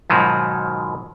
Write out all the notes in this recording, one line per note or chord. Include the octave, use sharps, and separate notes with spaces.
G#2 B2 D#3 F3 F#3